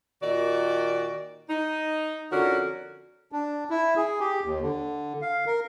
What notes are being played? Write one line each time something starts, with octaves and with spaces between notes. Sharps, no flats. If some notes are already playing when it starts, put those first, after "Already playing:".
A#2 D#3 F#4 D5
D#4
F2 D3 C#4 F#4 A#4
D4
E4
G#4
G4
D#2
D3
F5
A#4